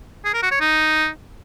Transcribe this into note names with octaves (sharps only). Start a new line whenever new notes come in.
G#4
A#4
F#4
C#5
D#4